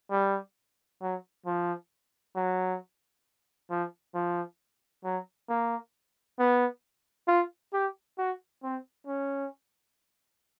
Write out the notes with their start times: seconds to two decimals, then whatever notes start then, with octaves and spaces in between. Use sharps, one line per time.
0.11 G3
1.02 F#3
1.46 F3
2.36 F#3
3.70 F3
4.15 F3
5.04 F#3
5.49 A#3
6.39 B3
7.28 F4
7.73 G4
8.18 F#4
8.63 C4
9.07 C#4